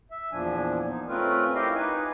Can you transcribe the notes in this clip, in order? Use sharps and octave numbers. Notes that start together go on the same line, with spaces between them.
E5
E2 A#2 F3 D4 G#5
D#4
A3 C4 C#4 F4 A#4 B4
E4 G4 A#4 D#5 F5 G5
D#4 B4 G#5